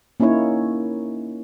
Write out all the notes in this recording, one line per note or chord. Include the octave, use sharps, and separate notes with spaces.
A#3 C#4 D#4 E4 C#5